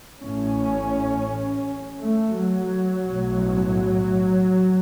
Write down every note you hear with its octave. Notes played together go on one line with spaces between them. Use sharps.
A1 A2 C#4
A3
F#3
B1 A2